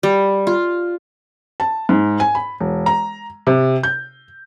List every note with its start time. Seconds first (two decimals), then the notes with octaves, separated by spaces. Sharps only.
0.03 G3
0.47 F4
1.60 A5
1.89 G#2
2.20 G#5
2.35 B5
2.60 E1
2.86 A#5
3.47 C3
3.83 G6